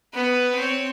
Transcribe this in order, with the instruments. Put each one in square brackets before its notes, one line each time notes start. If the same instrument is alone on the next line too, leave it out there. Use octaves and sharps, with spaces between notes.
[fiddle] B3 B4
C4 C#5